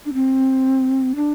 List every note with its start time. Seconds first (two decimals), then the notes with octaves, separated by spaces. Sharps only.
0.06 D4
0.14 C4
1.16 D4